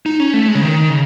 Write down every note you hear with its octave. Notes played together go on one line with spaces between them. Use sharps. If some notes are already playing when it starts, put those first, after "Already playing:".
D#4
C#4
A3
G#3
C#3
D#3
C#3